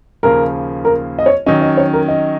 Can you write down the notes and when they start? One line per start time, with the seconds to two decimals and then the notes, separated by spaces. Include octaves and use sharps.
0.23 D#2 C#3 F3 A#3 F4 A#4
0.85 A#4
1.19 D#5
1.26 C#5
1.46 D#3 F#3 C#4 D#5
1.62 D#5
1.77 C#5
1.94 A#4
2.08 D#5